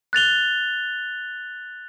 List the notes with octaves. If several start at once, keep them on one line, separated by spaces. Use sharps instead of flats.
F#6 A6 F7 G7